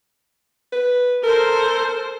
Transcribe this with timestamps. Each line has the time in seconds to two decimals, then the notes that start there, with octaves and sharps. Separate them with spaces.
0.72 B4
1.24 A4 A#4 C5